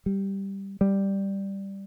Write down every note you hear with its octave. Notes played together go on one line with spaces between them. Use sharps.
G3
G3